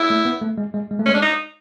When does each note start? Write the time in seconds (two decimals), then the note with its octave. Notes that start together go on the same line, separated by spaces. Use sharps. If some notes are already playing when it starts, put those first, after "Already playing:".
Already playing: E4
0.10 A3
0.25 B3
0.42 A3
0.58 G#3
0.74 G#3
0.91 G#3
0.99 A3
1.06 G#3 C#4
1.14 D4
1.22 D#4